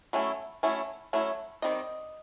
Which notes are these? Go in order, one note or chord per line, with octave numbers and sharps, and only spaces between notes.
F#3 A3 C#4 E4
F#3 A3 C#4 E4
F#3 A3 C#4 E4
D#3 G3 C4 D#5